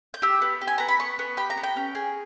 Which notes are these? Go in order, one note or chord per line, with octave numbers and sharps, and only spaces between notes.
G6
G4 E6
B3
G4
G#5
B3 A#5
B5
B3 C#6
B3
G4 B5
A#5
B3
G5
C#4
G#4